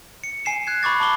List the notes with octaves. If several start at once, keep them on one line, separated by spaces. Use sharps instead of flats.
C#7
G#5 C7 E7
F#6 G#6 C7
B5 C#6 D6 A6
A5 B5 D6 G7